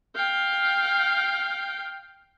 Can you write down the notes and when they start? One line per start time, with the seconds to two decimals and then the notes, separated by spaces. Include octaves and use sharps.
0.16 F5 G5